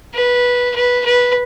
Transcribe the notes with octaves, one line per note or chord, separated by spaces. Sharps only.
B4
B4
B4